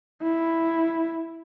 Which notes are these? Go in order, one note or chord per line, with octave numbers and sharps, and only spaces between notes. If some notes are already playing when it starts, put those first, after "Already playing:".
E4